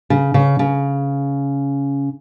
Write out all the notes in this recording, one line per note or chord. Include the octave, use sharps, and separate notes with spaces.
C#3
C#3
C#3